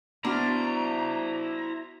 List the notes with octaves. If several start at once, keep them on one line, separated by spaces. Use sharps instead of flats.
B3 D4 E4 F#4 C5 A#5 F6